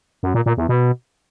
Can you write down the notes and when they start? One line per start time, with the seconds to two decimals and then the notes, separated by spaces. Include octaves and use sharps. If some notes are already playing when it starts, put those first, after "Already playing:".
0.23 F#2
0.34 A#2
0.46 A#2
0.57 E2
0.69 B2